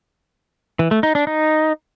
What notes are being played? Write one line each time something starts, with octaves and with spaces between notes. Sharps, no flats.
E3
A3
D#4
D4
D#4